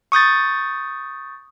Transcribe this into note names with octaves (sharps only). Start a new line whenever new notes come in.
C#6 D#6 G6 A6